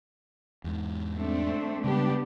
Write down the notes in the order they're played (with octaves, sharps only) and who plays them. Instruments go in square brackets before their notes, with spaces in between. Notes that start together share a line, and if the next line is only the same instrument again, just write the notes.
[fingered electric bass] E2 G#2
[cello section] A3 C4 D4
[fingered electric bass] C#3 G3 G#3 [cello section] B3 D4 G4